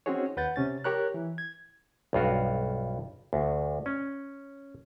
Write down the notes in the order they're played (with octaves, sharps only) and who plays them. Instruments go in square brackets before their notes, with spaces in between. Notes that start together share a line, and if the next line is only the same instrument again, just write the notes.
[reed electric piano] C4 C#4 D#4 F#4 G#4 C#5
D#2 B4 F#5 G6 A6
C3 C#4 A6
G4 A#4 C#5 A#5 F#6
E3
G#6
[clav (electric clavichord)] B1 G2 F4 F#4
D2
C#4